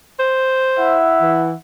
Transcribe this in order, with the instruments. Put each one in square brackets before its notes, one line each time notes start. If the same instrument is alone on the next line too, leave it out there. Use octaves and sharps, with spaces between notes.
[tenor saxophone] C5
[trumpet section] E4 E5 F#5
[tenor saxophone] E3